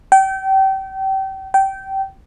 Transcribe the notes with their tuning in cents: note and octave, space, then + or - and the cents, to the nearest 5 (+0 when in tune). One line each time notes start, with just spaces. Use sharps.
G5 -30
G5 -20